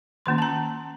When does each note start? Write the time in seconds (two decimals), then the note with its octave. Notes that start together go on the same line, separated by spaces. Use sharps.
0.26 D#3 A#3 C#4 C6
0.38 A5
0.42 A#5